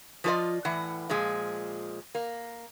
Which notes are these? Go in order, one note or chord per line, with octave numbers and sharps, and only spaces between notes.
F3 F#3 F4 A4 D5 D#5
A2 E3 F#5
A#2 F3 G#3
A#3